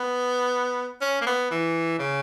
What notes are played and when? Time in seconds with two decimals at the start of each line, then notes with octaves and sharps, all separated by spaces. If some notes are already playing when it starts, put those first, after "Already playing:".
Already playing: B3
1.01 C#4
1.21 A#3
1.26 B3
1.51 E3
1.99 C#3